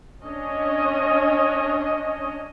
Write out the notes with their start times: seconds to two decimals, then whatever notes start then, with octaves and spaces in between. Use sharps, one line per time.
0.25 C#4 D4 C#5 D#5